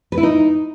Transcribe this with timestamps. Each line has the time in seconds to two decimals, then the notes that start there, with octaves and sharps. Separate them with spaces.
0.12 B4
0.18 E4
0.23 D#4